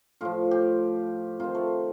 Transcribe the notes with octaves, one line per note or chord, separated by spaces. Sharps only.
A2 F3 F4
G4
C3 D#3 F4
A3